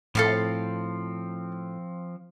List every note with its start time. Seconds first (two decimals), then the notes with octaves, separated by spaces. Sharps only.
0.15 A2 F3 C4 A4 F5 B5